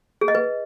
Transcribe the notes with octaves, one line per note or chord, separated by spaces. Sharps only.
G#4
D#5
B4